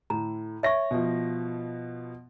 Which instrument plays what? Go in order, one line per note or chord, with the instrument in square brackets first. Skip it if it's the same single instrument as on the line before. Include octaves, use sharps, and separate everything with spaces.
[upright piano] A2 [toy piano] A#5
[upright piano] C#5 A#6 [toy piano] E5 C#6
[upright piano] B2 F3